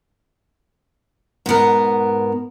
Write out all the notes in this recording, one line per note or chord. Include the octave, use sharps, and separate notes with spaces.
G#2 B2 B3 A#4